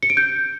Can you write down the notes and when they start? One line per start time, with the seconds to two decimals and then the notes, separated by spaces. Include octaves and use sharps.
0.03 C#7
0.10 D7
0.17 G6